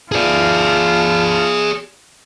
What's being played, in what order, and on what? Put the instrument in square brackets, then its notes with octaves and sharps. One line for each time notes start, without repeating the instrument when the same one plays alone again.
[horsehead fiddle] F4 A5 [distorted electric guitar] G#4 D5